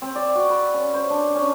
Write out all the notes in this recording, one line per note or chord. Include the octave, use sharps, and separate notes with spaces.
C4
D5
F#4
B4
C#4
C5
D4
C#4